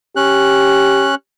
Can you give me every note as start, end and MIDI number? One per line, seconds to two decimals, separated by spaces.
0.16 1.15 61
0.16 1.10 67
0.16 1.15 90